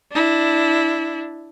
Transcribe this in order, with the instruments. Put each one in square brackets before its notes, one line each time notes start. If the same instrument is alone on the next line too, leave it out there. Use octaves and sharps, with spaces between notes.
[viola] D4 E4